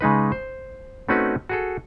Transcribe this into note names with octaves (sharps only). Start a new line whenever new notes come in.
C#3 G#3 D#4 B4
C5
A3 C4 C#4 D#4 F#4 B4
F#4 G#4 A4